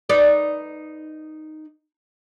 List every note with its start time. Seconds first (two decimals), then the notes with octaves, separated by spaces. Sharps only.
0.09 D#4 B4 D5